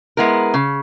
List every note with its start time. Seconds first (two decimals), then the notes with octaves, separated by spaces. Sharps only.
0.17 G#3 B3 E4 A#4
0.54 C#3